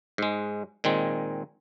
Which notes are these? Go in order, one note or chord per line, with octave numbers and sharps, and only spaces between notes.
G#2 G#3
A#2 D#3 G#3 C4